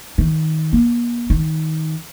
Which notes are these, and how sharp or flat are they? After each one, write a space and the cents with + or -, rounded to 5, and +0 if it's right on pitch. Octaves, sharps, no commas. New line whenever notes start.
D#3 +20
A#3 +40
D#3 +20